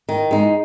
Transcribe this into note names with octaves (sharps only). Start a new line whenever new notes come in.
D#3
G#3 D#4